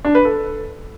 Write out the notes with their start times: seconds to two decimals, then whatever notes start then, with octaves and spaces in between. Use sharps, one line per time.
0.05 D4
0.15 B4
0.25 A4